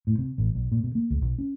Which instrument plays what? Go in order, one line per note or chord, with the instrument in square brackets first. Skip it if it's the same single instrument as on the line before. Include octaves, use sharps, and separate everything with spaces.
[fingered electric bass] A2
C3
A1
B1
A#2
B2
A#3
C#2
B1
C#4